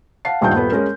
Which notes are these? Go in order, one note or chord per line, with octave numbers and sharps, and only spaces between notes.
F5 F#5 A5 C7
D#1 G2 D#3 D#5 G5 G6
D#1 B3 A4 B4
G#3 C#4 A#4